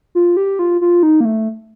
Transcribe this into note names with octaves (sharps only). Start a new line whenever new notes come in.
F4
G4
F4
F4
D#4
A#3
A3